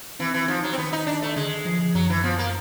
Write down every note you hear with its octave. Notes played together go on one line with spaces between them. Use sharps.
E3 C4
E3
F3 D#4
F#3
C4
D#3 B3
D#4
D#3 D4
A3
D3 G#3
F3
F#2 F#3
E3
F3 B3
A#3